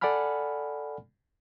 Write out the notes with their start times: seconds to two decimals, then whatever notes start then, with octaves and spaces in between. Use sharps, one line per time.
0.01 A4 D5 F#5 G#5 B5 F6